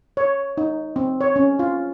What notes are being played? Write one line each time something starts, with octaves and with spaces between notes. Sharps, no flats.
C#5
D#4
C4
C#5
C#4
F4